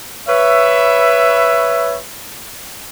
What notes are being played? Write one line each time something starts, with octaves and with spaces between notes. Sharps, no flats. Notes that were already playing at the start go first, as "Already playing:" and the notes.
B4 C#5 E5